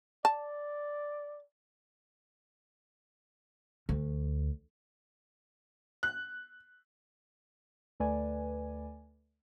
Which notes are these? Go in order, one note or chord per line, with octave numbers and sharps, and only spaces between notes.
D5 A5
D2
F#6
D2 A3 B4 D5 G#5